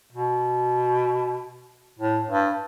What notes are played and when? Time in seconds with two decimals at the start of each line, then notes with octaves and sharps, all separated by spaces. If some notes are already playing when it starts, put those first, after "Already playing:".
0.12 B2
1.99 A2
2.29 G2